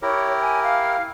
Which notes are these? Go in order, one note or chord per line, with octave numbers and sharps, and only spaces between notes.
E4 G4 A#4 C#5
G#5
F5